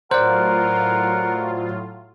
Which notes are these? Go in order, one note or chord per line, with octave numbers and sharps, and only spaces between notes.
A2 F#3 F4 A#4 C5 D5 F#5